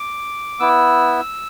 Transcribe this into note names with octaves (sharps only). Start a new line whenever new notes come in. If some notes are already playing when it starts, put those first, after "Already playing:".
Already playing: D6
B3 E4 E6